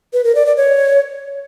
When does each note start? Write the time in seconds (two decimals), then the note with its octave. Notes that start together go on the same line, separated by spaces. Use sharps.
0.13 B4
0.24 A#4
0.35 D5
0.46 D5
0.57 C#5